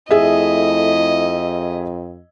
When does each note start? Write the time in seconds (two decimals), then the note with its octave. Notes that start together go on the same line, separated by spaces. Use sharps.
0.11 F2 A3 E4 G#4 D#5 E5